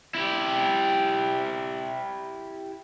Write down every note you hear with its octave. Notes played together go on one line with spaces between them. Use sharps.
E4 G4